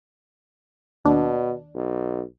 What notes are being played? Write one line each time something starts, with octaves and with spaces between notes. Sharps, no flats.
D#2 B2 D4
B1